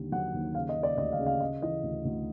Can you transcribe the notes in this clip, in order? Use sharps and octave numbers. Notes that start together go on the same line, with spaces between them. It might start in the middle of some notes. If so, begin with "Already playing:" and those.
Already playing: D#2 D3 G3
F#3 F#5
D#2
C#3 F5
D#5
C#3
D5
D2 D#5
F5
C#3
F5
C#3 D#5
E3 D#5
D2
D2